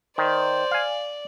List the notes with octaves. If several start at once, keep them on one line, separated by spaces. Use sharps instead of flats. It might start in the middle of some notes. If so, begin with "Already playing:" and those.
D#3 C5 D5
F5 G#5